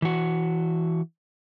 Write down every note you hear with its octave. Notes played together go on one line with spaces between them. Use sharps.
E3 F#4